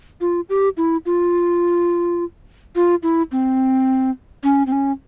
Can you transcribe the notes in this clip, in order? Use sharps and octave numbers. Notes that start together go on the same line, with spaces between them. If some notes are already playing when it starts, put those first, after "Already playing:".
F4
G4
E4
F4
F4
E4
C4
C#4
C4
C#4